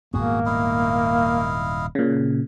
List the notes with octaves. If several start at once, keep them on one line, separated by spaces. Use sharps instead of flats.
D#1 G#2 A#3 B3 F#4 G#4
E4 D#5 F5
A#2 C#3